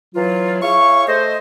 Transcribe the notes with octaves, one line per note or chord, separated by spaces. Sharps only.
E3 F#3 F4
E4 G#4 C#5 F5 C#6
A3 C5 D#5